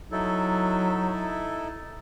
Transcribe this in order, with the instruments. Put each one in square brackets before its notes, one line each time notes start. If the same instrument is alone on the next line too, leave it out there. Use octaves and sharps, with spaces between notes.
[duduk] F#3 [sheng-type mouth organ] D#4 E4 A4